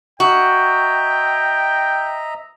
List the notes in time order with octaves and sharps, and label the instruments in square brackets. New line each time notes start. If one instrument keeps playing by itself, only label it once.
[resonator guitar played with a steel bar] F#4 [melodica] D#5 E5 A#5 [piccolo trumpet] G5